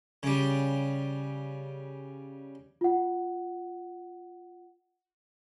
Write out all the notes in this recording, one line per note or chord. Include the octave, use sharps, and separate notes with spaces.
C#3 G3
F4 F#5